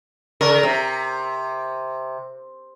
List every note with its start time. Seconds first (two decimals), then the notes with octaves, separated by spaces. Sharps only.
0.41 C#3 A#4
0.63 C3